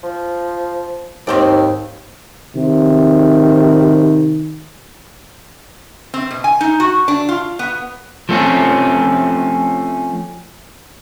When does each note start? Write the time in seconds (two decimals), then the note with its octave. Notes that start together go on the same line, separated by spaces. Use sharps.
0.04 F3
1.27 D#2 G#2 C4 D5
2.56 C3 D#3
6.14 C4
6.31 B2
6.44 G#5
6.61 D#4
6.80 F#4
7.08 D4
7.29 F4
7.59 B3
8.29 F3 A3 C4 C#4